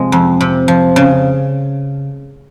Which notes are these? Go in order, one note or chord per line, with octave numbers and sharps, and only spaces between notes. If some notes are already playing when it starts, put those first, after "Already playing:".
Already playing: C3 F3 G#3
F2
C3
F3
C#3